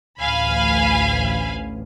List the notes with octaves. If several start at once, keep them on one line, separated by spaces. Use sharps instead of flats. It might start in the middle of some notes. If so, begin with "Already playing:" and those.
A1 D2 F5 G#5 B5